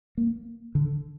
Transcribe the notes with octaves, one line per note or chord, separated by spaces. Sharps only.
A#3
D3